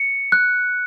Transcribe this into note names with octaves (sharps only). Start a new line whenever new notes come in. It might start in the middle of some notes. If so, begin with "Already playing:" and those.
Already playing: C#7
F#6